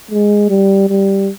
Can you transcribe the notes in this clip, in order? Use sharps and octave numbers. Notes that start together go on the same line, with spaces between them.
G#3
G3
G3